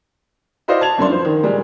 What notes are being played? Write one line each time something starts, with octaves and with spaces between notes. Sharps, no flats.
E4 F#4 C5 D5 D#5 F5
A5 G#6 F7
G1 F#2 D4 C6
F3 C5
D#3
A#2 G3 G#3